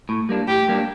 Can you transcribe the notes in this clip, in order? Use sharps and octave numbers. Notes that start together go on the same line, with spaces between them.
A2
G3 A#3 D4
A2 G4
G3 A#3 D4